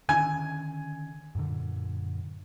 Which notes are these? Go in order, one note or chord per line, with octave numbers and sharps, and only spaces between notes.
D3 D#3 C#4 G#5
F#2 A#2 D3